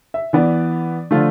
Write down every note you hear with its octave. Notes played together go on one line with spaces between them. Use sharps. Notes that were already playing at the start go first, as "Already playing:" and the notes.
E5
E3 B3 D5
D3 F3 A3 F4